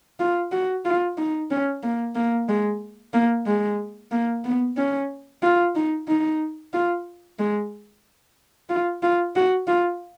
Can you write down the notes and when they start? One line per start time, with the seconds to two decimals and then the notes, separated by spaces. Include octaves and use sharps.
0.20 F4
0.52 F#4
0.85 F4
1.18 D#4
1.51 C#4
1.83 A#3
2.15 A#3
2.49 G#3
3.14 A#3
3.47 G#3
4.11 A#3
4.45 B3
4.77 C#4
5.43 F4
5.76 D#4
6.08 D#4
6.74 F4
7.39 G#3
8.70 F4
9.03 F4
9.36 F#4
9.68 F4